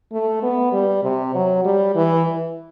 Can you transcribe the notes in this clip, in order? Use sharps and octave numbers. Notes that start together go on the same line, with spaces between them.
A3
B3
G3
C3
F#3
G3
E3